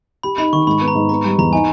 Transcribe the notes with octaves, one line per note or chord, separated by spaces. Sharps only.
G4 B5
D#4 B5
D#3 C#6
G#2 B5
B3
A#5
G#2
B3 A#5
G3
E2 A#5
D#4 G#5